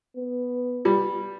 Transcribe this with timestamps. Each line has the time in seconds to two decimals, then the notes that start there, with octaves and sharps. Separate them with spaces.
0.17 B3
0.85 G3